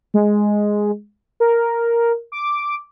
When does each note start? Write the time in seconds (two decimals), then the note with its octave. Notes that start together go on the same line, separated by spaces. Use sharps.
0.14 G#3
1.40 A#4
2.32 D6